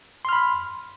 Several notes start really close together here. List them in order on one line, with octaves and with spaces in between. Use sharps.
C6 F6 B5